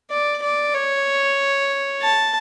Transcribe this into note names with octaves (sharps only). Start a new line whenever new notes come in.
D5
D5
C#5
A5